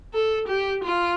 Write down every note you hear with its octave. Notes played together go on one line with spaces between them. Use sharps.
A4
G4
F4